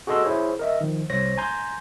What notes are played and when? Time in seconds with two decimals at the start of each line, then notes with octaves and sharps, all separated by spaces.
0.07 F#4 G#4 A4 D#5 C6 E6
0.24 E4 G#4 C5 C#5
0.59 A#4 D#5 E5
0.81 D#3 F3
1.10 C2 C5 C#5 A#6
1.38 G#5 A#5 C6 G6